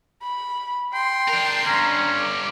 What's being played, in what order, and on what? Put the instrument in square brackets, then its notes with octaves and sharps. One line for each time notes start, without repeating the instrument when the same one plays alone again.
[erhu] B5
[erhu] G5 [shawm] C6
[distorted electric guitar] D4 A#4
[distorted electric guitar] G2 D3 [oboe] C#4 [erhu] A#5
[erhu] D6